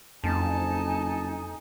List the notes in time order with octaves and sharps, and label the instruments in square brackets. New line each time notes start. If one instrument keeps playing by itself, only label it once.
[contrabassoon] F#1 [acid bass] F2 [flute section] D#4 G#5 [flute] A5